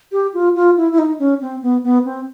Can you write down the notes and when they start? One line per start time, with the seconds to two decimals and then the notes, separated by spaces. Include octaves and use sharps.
0.12 G4
0.34 F4
0.56 F4
0.77 E4
0.92 E4
0.99 D#4
1.19 C#4
1.41 C4
1.62 B3
1.84 B3
2.05 C4